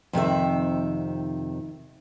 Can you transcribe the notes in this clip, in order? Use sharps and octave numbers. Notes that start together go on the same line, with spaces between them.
F2 C3 D#3 E5